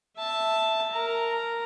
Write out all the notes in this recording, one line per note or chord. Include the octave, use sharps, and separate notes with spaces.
E5 A5
A#4 A#5